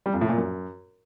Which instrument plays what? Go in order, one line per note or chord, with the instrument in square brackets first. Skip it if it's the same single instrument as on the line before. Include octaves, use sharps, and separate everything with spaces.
[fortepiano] G3
F2
A2
A#2
F#2